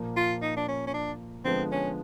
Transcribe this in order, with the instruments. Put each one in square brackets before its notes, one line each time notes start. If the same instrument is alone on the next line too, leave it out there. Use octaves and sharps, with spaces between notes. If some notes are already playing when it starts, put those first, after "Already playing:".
Already playing: [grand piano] A#2 F3 A#3
[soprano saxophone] F4
D#4
D4
C#4
C#4
D4
[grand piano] D3 F3 G#3 B3 [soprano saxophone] C4
[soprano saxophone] C#4